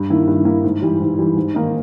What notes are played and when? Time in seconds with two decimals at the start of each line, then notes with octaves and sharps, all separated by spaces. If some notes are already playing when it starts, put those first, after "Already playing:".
Already playing: G2
0.10 D#3 A#3 E4
0.27 G2
0.45 D#3 A#3 E4
0.64 G#2
0.82 E3 G3
1.00 G#2
1.18 E3 G3
1.36 G#2
1.55 D#3 A#3 D#4